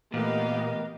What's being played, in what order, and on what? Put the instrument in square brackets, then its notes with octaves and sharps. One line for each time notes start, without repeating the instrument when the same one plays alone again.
[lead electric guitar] A#2 [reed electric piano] E3 A3 [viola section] B3 G4 F5 [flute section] A#4 D#5